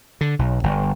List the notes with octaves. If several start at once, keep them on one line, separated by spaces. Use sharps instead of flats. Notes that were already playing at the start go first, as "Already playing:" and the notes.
D3
B1
G1